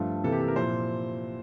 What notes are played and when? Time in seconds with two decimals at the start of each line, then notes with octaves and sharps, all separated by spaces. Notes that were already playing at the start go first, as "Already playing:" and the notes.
Already playing: G2 F3 A3 F4
0.24 C3 E3 A#3 A4
0.32 G4
0.40 A4
0.48 A#4
0.56 A#2 F3 C4 E4 C5